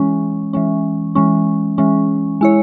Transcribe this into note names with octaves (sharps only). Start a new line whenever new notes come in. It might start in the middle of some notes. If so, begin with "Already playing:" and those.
Already playing: E3 G#3 C#4
E3 G#3 C#4
E3 G#3 C#4
E3 G#3 C#4
G#3 E4 C#5